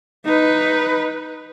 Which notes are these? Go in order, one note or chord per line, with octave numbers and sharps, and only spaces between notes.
D#4 B4